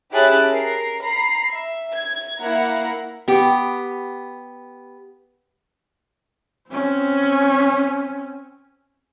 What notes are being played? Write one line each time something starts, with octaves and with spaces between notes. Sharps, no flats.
C#4 E4 G4 G#4 A5 F#6
A#4 C7
A#5 B5 C7
E5
G#6
A#3 E4 F#5 A#5
B3 G4
C4 C#4